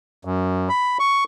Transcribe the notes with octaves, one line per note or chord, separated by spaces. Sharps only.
F#2
B5
C#6